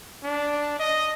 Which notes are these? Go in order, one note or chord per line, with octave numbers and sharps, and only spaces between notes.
D4
D#5